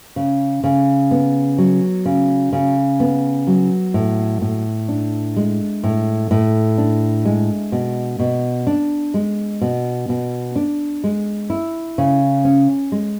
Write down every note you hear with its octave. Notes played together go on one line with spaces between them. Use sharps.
C#3
C#3
B3
F#3
C#3
C#3
B3
F#3
A2
A2
D4
G#3
A2
A2
D4
G#3
B2
B2
D4
G#3
B2
B2
D4
G#3
E4
C#3
C#4
G#3